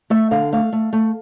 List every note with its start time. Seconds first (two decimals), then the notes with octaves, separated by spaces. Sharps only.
0.10 A3 E5
0.31 D3 F5
0.52 A3 F5
0.73 A3
0.93 A3